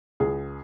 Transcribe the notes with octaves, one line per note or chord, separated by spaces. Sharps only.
C#2 G#4